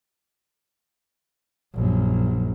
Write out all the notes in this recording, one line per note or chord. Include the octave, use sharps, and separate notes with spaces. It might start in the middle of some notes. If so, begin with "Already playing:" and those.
A#1 F#2